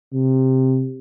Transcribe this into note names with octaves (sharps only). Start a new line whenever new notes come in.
C3